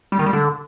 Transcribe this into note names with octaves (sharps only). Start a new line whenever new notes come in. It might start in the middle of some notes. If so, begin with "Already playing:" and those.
G3
D#3
G3
D3